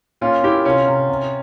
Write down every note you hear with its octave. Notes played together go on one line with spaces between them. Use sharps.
A#2 C#4 F4
A#2 E4 G4
C3 C#4 F4
C3
C3